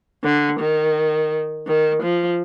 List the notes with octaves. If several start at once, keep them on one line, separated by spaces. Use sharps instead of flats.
D3
D#3
D#3
F3